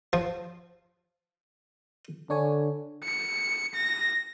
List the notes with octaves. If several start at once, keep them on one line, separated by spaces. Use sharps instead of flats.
F3
D3 D4 C#5 G#5
C#7
A#6